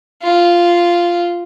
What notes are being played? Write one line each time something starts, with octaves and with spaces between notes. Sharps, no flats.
F4